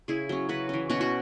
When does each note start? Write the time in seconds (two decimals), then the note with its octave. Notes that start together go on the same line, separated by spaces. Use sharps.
0.08 C#3 E4 G#4
0.29 F#3 C#4
0.49 C#3 F#4 B4
0.69 E3 C#4
0.89 B2 C#4 F#4
1.01 F#4